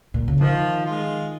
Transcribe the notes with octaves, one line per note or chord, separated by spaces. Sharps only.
A#2
C#3
D#3 F3
G#3 F4